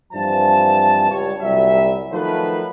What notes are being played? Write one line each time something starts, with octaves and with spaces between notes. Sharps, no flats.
G2 E3 F3 C4 A5
C#2 G3 C#5
C2 A#2 F#3 G3 E5
D#3 F3 F#3 A3 B4